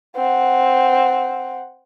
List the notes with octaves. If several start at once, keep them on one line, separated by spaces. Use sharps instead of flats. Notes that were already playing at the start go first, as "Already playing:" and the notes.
C4 F#5